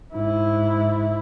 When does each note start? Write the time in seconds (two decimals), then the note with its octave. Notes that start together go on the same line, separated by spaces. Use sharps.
0.14 G#2 E4